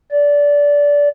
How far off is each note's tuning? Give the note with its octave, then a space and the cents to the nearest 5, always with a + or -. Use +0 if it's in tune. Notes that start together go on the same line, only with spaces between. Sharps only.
D5 -20